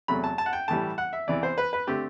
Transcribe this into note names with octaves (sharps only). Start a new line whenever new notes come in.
E2 C3 F#3 A3 B5
A5
A5
F#5
G5
A2 E3 G3 A5
F#5
E5
E2 C3 E3 D5
C5
B4
B4
D3 A3 C4 G4